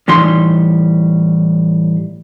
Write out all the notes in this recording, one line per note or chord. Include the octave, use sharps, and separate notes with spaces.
A2 E3 G3 D#4 C6